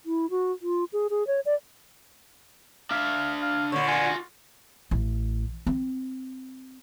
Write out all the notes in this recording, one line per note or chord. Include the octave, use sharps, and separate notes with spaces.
E4
F#4
F4
G#4
G#4
C#5
D5
D4 E5 F5
F5
A#2 D3 C#5
F4 F#4 G#5
A1
C4